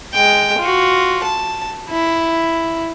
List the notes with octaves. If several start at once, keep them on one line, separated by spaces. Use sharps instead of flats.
G#3 G5
F4 F#4
A5
E4